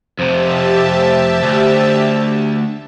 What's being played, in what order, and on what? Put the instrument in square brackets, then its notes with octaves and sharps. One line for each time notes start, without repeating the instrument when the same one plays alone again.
[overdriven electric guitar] F2 C3 [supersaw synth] G4 E5 A5 [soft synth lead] C5
[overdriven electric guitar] D2